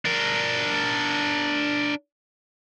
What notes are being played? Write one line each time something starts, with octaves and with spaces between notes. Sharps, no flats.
D4 A#4